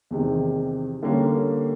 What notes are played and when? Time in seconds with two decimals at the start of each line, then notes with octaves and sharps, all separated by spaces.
0.11 E2 C3 D#3
1.02 D3 G3 A#3 C#4